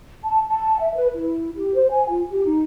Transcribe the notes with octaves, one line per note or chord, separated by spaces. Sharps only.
A5
A5
E5
B4
E4
G4
C5
G#5
F4
G4
D#4